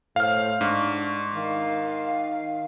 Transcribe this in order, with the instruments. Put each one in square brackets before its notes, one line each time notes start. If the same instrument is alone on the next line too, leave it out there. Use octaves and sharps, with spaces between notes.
[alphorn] A2 [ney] C5 [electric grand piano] F5 F6
[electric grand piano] G#2 [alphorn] D4 [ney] C#6
[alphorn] D#3 [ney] F5